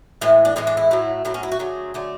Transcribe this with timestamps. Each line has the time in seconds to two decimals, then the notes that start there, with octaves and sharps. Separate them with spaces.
0.21 A2 E3 G#3 E4
0.45 D4
0.56 A2 E3 G#3 E4
0.67 D4
0.77 E4
0.91 A2 F#3 A3
1.25 A2 F#3 A3 E4
1.34 C#4
1.43 E4
1.52 F#4
1.59 D3 F#3 A3 G#4
1.94 D3 F#3 A3